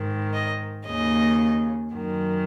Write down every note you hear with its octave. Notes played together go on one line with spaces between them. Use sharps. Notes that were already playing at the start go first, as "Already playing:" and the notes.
Already playing: G#2 D#3
D#5
D#2 C#3 D#5
F#2 D#3